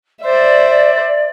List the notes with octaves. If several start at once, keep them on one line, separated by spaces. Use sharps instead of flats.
C5 D5 E5